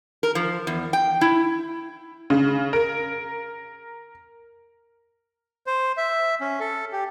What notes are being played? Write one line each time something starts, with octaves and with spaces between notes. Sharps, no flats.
A#4
F3
E2
G5
E4
C#3
A#4
C5
E5
C#4
A4
G4